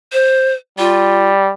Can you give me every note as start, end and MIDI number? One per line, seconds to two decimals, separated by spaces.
0.13 0.53 72
0.79 1.52 55
0.79 1.29 65